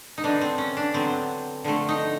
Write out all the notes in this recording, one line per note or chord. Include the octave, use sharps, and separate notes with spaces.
D#4
D3 F#3 B3 D4
C4
C#4
D4
D3 F#3 B3 C4
D3 F3 A3
D#4